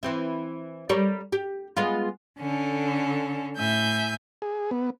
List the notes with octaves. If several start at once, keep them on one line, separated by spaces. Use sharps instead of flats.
E3 C4 E4
G3 A#4 C#5
G4
G#3 B3 F4
D3 C#4 A4
A2 E5 G#5 G6
G#4
B3